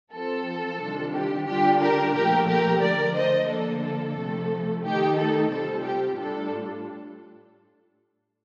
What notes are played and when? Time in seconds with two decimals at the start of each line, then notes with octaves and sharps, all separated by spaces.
0.13 F3 C4 F4 A4
0.80 C3 D#3 G3 D4 F4
1.14 G4
1.47 D3 G3 D4 F4 G4
1.80 G4 A#4
2.14 A#2 F3 A3 G4 A#4
2.48 G4 A#4
2.81 D3 F3 A3 A#4 D5
3.15 C5 D#5
3.48 D3 F3 A#3 D4 A4
3.83 A4
4.16 C3 F3 A3
4.83 D#3 A3 D#4 G4
5.17 A4
5.50 C3 G3 C4 F4 A4
5.84 G4
6.18 A2 G3 D4 F4 A4